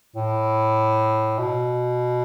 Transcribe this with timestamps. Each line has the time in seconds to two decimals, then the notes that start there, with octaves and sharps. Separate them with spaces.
0.16 A2
1.39 B2